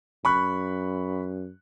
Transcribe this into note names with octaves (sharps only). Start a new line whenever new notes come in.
F#2 B5 C#6 F#6